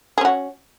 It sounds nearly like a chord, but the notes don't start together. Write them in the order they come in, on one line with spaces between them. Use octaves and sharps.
G#4 C#4 F#4